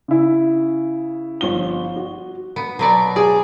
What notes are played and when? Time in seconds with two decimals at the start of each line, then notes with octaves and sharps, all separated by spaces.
0.08 C#3 E4
1.41 G1 F3 G7
1.96 F#4
2.56 B3
2.79 B2 F#3 D5
3.16 G#4 D5